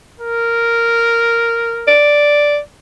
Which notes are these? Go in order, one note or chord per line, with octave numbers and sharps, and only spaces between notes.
A#4
D5